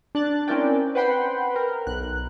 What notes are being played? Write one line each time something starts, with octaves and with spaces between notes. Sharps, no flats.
D4 F#6 A6
C4 C#4 E4 A#4 D5 G5
B4 C5 F#5 G5 B5 C6
A#4
B1 F#6